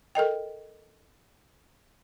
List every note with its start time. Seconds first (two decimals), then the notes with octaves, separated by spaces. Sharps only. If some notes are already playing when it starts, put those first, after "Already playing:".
0.15 A4 A#4 D#5 G5